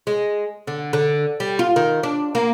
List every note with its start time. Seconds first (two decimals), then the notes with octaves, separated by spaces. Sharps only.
0.07 G#3
0.67 D3
0.93 D3
1.40 G3
1.59 F4
1.76 D#3
2.03 D4
2.35 A#3